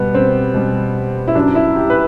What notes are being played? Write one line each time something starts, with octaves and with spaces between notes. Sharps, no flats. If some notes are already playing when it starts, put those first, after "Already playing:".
Already playing: B2 G3 B3
C4
B2 G3
E4
F#2 F#3 D4
E4
G4
B4